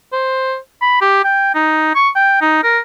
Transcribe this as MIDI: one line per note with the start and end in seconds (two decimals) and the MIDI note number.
0.13 0.56 72
0.82 0.98 83
1.01 1.24 67
1.25 1.54 79
1.55 1.92 63
1.95 2.09 85
2.16 2.38 79
2.41 2.63 63
2.64 2.79 70